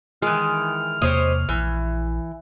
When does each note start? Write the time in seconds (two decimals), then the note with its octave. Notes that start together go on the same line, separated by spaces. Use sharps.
0.22 D#3 E3 G#3 F6
1.02 E2 C3 A#3 G4 C5 C#5 D#5
1.49 A#1 E3